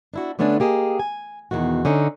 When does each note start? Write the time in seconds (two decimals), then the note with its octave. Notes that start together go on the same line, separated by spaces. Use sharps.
0.14 D4 E4 F#4
0.39 D3 A3 B3 C#4 D4
0.60 A#3 G4 G#4 D#5
1.00 G#5
1.51 E2 B2 D#3 F#4
1.85 D3 C#4 D#4